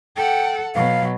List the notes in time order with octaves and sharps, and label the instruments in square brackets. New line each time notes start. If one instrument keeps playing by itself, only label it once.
[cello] A4 F#5 [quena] G5
[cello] B2 F#3 [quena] F5